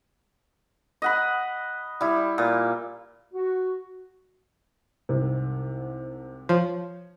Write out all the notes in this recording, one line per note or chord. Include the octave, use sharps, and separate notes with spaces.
D#5 F#5 B5
G3 E4
A#2
F#4
C2 G#2 C3
F3 C#5